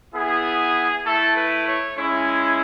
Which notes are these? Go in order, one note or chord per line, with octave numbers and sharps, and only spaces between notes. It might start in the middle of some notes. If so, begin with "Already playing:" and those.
B3 E4 G#4
A3 E4 A4
B4
C#5
G#3 C#4 E4